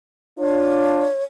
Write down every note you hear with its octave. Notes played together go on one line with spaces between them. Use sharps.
D4 F4 C#5